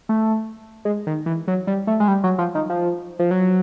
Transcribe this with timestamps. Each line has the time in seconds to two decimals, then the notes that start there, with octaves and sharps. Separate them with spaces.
0.09 A3
0.85 G#3
1.07 D#3
1.26 E3
1.48 F#3
1.67 G3
1.87 A3
2.00 G#3
2.08 G3
2.24 F#3
2.38 F3
2.55 D#3
2.70 F3
3.19 F3
3.31 F#3